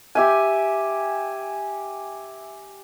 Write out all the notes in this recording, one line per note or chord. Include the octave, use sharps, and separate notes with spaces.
G4 E5 G#5